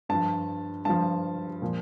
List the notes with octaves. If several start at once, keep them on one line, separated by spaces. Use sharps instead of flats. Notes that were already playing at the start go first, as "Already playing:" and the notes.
G2 F3 A5
G2 F3 A5
A#2 F3